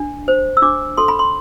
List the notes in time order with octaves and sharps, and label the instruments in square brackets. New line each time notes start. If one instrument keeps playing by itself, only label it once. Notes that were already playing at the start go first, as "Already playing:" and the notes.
Already playing: [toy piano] D4
C5
E6
D4 D6
A4 C6
B5
C6